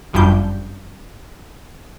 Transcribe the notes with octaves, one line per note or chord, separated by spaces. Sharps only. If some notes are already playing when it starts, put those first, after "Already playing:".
G1 F#2 F3 G3 D4 G6